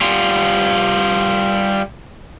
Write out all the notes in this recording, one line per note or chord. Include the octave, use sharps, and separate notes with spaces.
G3 F4